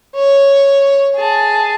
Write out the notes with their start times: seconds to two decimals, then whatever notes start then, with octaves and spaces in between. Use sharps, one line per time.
0.16 C#5
1.16 G#4 A5